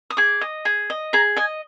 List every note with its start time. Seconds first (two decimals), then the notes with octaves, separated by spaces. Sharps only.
0.10 D#6
0.17 G#4 D6
0.41 D#5
0.65 G#4
0.90 D#5
1.13 G#4 A#5
1.36 D#5 G#5